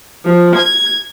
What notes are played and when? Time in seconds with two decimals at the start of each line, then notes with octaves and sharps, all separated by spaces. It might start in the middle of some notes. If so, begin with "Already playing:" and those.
0.24 F3
0.56 G#6